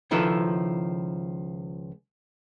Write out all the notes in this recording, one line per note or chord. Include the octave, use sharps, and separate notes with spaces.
C#2 D#3 F3 E4 A4 B4